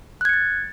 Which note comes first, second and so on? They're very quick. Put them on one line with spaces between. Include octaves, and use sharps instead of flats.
F#6 G#6 C#7 A6